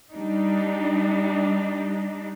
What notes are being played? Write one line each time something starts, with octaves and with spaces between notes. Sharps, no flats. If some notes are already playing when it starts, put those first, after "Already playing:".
G3 D4 D#4